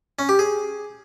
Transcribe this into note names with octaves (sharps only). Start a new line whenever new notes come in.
C#4
G4
G#4